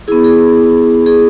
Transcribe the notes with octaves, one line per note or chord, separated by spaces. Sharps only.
B3 E4 G#4
G#4
G#4